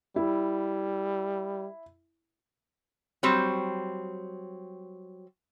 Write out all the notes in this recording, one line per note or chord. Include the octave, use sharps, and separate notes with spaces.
G3 E4
F#3 G3 C4